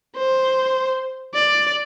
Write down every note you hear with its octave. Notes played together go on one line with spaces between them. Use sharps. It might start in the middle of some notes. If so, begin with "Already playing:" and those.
C5
D5